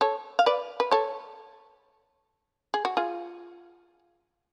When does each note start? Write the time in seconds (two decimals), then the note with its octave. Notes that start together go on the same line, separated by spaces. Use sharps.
0.01 A4 C#5
0.39 F5
0.46 B4 D5
0.80 B4
0.91 A4 C#5
2.74 G#4
2.85 F#4
2.97 F4 G#4